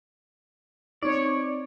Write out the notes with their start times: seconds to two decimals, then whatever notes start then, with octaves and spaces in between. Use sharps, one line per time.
1.03 C4 D#4 C#5 D5